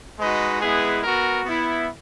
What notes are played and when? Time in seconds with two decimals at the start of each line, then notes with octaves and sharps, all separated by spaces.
0.19 G#3 D#4 F#4 B4 D#5
0.61 G#3 B3 E4 G#4 B4
1.02 B3 F#4 A#4
1.45 B3 E4